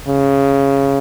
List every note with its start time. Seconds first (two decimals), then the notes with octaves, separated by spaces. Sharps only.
0.08 C#3